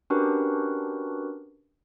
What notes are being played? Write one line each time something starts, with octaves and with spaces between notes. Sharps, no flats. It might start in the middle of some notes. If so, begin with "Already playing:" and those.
C#4 D4 F#4 G4 A#4 B4